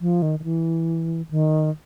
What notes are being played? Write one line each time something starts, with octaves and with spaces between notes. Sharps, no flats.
F3
D#3
D#3
E3
D#3